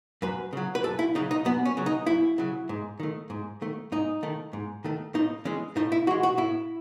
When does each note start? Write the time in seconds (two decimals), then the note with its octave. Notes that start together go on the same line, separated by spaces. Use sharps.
0.22 F#2 B4
0.53 C#3 F#3
0.75 B4
0.83 F#2 A4
0.99 E4
1.15 C#3 F#3 D#4
1.31 D#4
1.45 F#2 B3
1.65 C#4
1.77 C#3 F#3
1.86 D#4
2.07 F#2 E4
2.38 C#3 F#3
2.69 G#2
3.00 D#3 A3
3.30 G#2
3.62 D#3 A3
3.92 G#2 D#4
4.23 D#3 A3
4.53 G#2
4.84 D#3 A3
5.15 A2 D#4
5.45 E3 G#3 C#4
5.76 A2 D#4
5.92 E4
6.07 E3 G#3 F#4
6.23 F#4
6.37 A2 E4